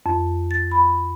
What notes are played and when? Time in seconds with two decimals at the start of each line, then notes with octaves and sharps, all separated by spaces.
0.06 F2
0.51 A6
0.71 B5